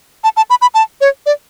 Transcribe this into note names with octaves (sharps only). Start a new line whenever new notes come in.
A5
A5
B5
B5
A5
C#5
D5